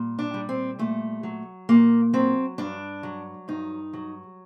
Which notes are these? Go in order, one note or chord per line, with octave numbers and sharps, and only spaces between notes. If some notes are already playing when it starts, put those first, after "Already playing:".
Already playing: A#2 G3
D4
G3
C4
A#2 A3
F#3
A#2 A#3
F#3 C4
G2 D4
F#3
G2 D#4
F#3